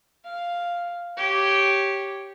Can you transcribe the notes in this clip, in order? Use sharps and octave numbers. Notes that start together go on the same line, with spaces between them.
F5
G4 C#5